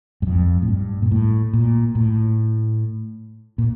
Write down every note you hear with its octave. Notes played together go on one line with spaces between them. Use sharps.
G2
F2
A2
G2
A#2
A2
A#2
A2
A#2